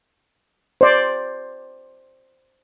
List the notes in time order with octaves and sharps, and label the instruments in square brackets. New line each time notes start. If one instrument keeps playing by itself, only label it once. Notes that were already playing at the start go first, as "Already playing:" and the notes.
[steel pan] C5 D5